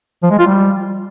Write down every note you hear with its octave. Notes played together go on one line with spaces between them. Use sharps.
F3
G#3
F4
G3